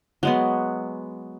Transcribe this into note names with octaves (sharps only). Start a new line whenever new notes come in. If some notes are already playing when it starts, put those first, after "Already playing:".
F#3 G#3 B3